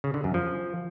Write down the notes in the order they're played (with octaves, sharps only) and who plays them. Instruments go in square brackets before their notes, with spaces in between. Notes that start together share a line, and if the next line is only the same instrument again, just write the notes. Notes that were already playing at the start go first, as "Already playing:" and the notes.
[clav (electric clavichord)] C#3
D3
F#2
F3